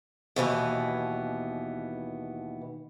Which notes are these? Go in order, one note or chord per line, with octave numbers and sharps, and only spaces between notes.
D#2 B2 E3 B3